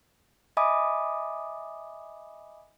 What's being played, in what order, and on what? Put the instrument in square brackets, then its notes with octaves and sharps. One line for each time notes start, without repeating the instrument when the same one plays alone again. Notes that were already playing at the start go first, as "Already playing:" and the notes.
[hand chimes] D#5 E5 G#5 B5 D6 D#6